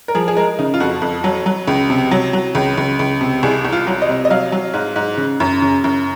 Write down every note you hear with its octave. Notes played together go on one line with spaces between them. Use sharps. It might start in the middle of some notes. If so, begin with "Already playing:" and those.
A#4
F3 G#4
G#4
G#3 A#4
C#3 D#4
F4
F2 F#4
F2
F#3
F#3
C#2
C3
F#3
F#3
C#2
C#2
C#2
C3
C2 G#4
C2
F4
F#3
D#5
C3
D#5
F#3 F5
F#3
G#2
G#2
C#3
F#2
C#3
F#2